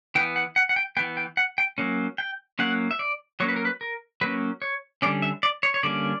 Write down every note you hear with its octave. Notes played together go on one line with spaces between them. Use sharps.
E3 B3 G5
F#5
F#5
F#5
G5
E3 B3 G5
G5
F#5
G5
F#3 A#3 C#4
G5
F#3 A#3 C#4 F#5
E5
D5
F#3 A#3 C#4 C#5
B4
A#4
B4
A#4
F#3 A#3 C#4 B4
C#5
D3 G3 A#3 C#4 D5
E5
D5
C#5
C#5
D3 G3 A#3 C#4 D5